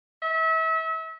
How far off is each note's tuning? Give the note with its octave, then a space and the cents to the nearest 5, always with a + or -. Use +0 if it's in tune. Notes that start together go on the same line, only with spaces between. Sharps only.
E5 -35